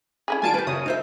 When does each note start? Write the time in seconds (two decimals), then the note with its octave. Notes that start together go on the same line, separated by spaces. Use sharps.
0.28 C#4 E4 G#4
0.42 D#3 G3 F4 G#5 A5 D7
0.54 G4 B4
0.67 F#2 C#3 C#5 D#6
0.86 D#4 C5 E5